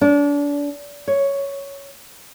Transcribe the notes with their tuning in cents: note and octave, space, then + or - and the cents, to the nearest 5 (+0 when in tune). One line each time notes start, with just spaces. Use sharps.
D4 -30
C#5 +5